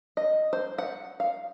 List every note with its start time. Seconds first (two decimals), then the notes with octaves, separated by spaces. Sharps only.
0.17 D#5
0.53 C5
0.78 F#5
1.20 F5